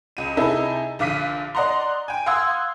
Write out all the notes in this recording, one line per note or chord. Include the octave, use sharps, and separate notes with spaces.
C#2 D#7
C3 D#4 E4 G#4 A4
A#1 D3 F5 D6 B6 D#7
D5 D#5 F#5 A#5 C6
G5 G#5
F5 F#5 C6 D#6 E6 G#6